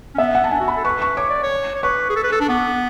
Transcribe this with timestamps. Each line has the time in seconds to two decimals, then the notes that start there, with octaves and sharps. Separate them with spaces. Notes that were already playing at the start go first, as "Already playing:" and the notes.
0.15 C#4
0.18 B3 E5
0.35 F#5
0.44 A5
0.51 D4 G#5
0.60 F#4
0.68 B5
0.76 A4
0.85 B4 C#6
1.02 C#6
1.17 C#5 D6
1.30 D5
1.43 C#5
1.75 C#5
1.83 B4 C#6
2.10 G#4
2.16 A4
2.24 B4
2.32 A4
2.41 D4
2.48 B3 D6